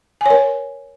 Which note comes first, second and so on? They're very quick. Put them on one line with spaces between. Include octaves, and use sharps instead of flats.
G#5 C#5 A#4